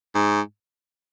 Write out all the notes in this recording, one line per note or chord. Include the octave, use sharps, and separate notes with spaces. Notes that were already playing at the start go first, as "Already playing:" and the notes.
G#2